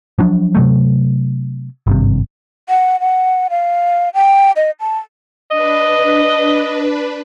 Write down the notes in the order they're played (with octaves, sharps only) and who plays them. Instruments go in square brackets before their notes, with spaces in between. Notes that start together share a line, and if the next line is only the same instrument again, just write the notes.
[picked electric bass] F3 F#3 D4
C3 F#3 A3
G#1 G2 C3
[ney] F#5
F#5
F5
G5
D#5
A5
[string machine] D4 B4 [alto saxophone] D#5